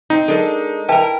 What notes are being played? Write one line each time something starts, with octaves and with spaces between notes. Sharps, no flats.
C4 D#4
G#3 D4 A4 A#4
E4 A#4 B4 G5 A5